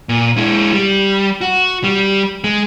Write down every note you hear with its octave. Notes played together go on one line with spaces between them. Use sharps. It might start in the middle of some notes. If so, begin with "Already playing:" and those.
A#2
G#3 E4
G3
F#4
G3
G#3